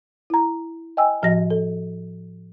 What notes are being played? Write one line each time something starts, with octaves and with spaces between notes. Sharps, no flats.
E4 A#5
D#5 G5 G#5 E6
A2 F3 F#4 D#5 A#6
A4